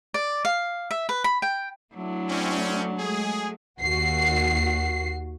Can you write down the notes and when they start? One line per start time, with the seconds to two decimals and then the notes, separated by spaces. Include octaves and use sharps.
0.14 D5
0.45 F5
0.91 E5
1.09 B4
1.24 B5
1.42 G5
1.95 F#3 A3 D4 E4
2.29 C4 C#4
2.98 G#3 A3 G#4
3.81 D#2 F#4 C7